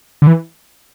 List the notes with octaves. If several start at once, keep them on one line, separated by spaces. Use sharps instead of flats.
D3
E3